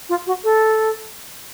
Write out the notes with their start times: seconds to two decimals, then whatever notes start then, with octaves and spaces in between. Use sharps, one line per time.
0.09 F4
0.27 F#4
0.44 A4